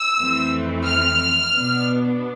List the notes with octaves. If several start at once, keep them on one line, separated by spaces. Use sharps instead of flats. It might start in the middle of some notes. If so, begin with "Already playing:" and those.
Already playing: E6
F2 E3 A3 C4
F6
B2 B3 D4